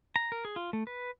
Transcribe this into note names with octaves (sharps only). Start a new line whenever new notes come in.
A#5
A#4
G#4
F4
A3
B4